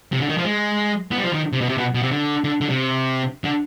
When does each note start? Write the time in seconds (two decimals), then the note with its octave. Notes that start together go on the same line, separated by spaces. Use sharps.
0.12 C3
0.20 D3
0.29 D#3
0.38 F3
0.45 G#3
1.11 B3
1.18 G3
1.23 F3
1.33 D#3
1.53 C3
1.61 B2
1.69 C3
1.78 B2
1.94 B2
2.03 C3
2.12 D3
2.44 D3
2.61 D3
2.69 C3
3.44 D3